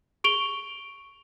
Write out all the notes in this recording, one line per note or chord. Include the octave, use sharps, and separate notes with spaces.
C#6 D7 F7 G7